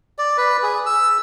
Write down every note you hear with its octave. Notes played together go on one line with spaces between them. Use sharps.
D5
B4
G#4
E6